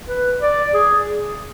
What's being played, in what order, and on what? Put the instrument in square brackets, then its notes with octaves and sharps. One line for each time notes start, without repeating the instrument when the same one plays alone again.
[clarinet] B4
D5
G#4